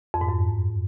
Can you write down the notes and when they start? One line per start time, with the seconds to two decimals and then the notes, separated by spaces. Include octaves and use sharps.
0.14 F2
0.21 G#2
0.28 F#2